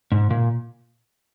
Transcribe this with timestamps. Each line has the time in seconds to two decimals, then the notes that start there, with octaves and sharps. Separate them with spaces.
0.12 G#2
0.30 A#2